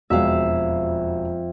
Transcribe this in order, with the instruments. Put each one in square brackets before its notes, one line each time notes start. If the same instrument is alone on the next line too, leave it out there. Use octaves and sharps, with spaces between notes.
[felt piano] E1 F#4 F5 [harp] F2 E5